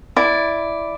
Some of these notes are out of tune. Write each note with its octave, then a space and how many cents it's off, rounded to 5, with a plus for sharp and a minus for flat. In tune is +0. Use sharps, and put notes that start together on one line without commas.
E4 +0 D5 +0